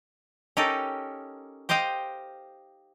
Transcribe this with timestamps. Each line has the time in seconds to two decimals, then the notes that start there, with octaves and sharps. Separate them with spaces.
0.57 C#4 D#4 G4 A4 A#4
1.69 G4 C5 D#5 F5 G5